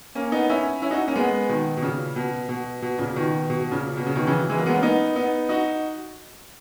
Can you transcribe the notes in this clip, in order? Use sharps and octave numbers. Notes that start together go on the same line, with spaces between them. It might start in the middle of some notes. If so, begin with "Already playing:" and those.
A#3 C#4
B3 D#4
C#4 E4
C#4 E4
D#4 F#4
A#3 C#4
G#3 B3
B2 D#3
B2
A#2 C#3
B2
B2
B2
A#2 C#3
B2 D#3
B2
B2
A#2 C#3
B2
C#3
B2 D#3
C#3 E3
E3 G#3
F#3 A#3
G#3 B3
A#3 C#4
B3 D#4
B3 D#4
D#4 F#4